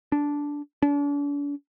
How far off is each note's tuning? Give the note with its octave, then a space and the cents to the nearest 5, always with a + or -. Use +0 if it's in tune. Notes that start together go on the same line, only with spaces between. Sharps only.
D4 -10
D4 -40